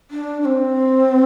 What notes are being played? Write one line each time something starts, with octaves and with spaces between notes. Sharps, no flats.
D4
D4
C4